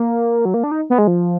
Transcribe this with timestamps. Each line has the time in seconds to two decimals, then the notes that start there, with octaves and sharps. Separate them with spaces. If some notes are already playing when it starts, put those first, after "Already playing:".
Already playing: A#3
0.45 F#3
0.54 A#3
0.64 D4
0.71 D#4
0.90 B3
0.98 G#3
1.07 F3